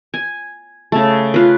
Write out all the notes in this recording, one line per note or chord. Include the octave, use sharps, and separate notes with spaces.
G#5
C#3 A3
F4 B4